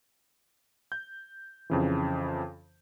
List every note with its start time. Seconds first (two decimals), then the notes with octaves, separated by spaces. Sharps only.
0.92 G6
1.70 F2 C#3 E3